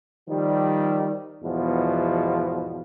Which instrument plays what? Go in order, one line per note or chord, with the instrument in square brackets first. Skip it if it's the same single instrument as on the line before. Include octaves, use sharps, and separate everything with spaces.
[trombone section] D#3 F3 G3
E2 G#2 B2 F3